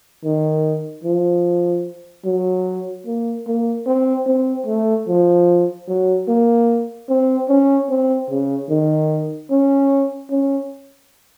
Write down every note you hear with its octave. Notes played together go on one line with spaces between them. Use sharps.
D#3
F3
F#3
A#3
A#3
C4
C4
A3
F3
F#3
A#3
C4
C#4
C4
C#3
D#3
C#4
C#4